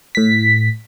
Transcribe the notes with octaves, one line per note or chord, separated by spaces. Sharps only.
A2 B6